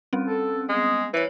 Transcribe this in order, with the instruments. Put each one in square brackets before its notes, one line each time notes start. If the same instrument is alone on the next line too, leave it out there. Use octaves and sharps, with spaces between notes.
[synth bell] G3 C4 C#4
[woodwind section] A4
[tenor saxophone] G#3 [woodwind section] B3 G#4
[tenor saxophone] E3 [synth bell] C5 C#5